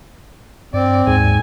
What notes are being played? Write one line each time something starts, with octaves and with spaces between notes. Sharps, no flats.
G2 C4 D5
D#2 G#2 G#5